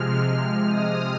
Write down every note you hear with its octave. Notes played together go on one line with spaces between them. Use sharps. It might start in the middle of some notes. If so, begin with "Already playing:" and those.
Already playing: C3 F3 G#3 F6
D#6